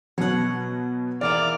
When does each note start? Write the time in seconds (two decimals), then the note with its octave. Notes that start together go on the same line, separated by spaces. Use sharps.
0.18 B2 F#3 C#5 F#5
1.21 E2 A#3 E4 D5 D6 F6